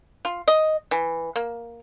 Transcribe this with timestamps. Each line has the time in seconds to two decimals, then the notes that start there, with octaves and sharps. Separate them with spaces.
0.25 F4
0.48 D#5
0.91 E3
1.36 A#3